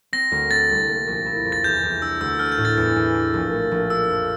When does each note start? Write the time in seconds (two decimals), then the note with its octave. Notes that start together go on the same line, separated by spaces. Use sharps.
0.13 C4 A#6
0.32 D2
0.51 C4 A6
0.69 C2
0.88 A#3
1.07 A#1
1.26 E4
1.45 F2
1.52 A6
1.64 E2 G6
1.83 E2
2.02 D4 E6
2.21 D2 E6
2.39 D4 F6
2.52 G6
2.58 A2
2.65 A6
2.77 E2 G6
2.96 E2
3.14 D4
3.34 A#1
3.53 A3
3.71 A#1
3.90 D4 E6
4.09 F2